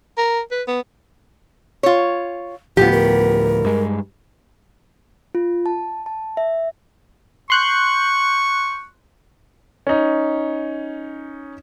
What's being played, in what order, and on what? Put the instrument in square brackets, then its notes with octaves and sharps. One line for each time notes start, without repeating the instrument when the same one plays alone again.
[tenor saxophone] A#4
B4
B3
[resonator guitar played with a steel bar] F4 C#5
[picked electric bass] D2 A2 F3 [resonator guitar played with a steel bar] B3 G4 [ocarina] F4
[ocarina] A#4
[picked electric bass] G2 G#3
[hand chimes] F4
A5
A5
E5
[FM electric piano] C6 F#6 G6 [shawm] C#6
[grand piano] C#4 D#4